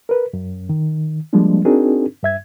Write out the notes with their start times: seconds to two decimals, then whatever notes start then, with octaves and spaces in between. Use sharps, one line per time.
0.09 A#4 B4
0.33 F#2
0.69 D#3
1.33 F3 G3 G#3 A#3 D4
1.65 C4 D4 D#4 F#4 G#4 A#4
2.23 G2 E5 G#6